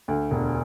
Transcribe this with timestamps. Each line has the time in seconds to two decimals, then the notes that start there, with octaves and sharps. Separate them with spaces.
0.08 D2
0.31 E1